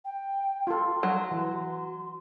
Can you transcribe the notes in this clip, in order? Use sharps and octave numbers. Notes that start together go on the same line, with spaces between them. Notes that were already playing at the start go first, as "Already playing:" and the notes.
G5
F4 A4 C6
F#3
E3